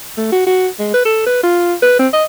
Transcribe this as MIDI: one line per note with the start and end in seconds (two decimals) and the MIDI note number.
0.17 0.29 57
0.32 0.44 66
0.47 0.68 66
0.79 0.89 56
0.94 1.02 71
1.05 1.25 69
1.26 1.40 71
1.43 1.74 65
1.82 1.99 71
1.99 2.08 60
2.13 2.25 75